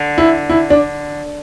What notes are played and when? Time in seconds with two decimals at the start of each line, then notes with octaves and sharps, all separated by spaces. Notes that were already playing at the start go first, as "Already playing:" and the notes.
Already playing: D3
0.18 E4
0.50 E4
0.70 D4